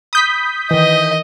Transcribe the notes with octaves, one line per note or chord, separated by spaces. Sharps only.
B5 D#6 G6 B6
D#3 E3 D#5